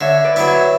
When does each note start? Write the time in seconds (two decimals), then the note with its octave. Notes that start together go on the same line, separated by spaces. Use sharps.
0.01 D3 C#5 E5
0.24 B4 D5
0.36 F#3 B3 E4
0.47 C#5 E5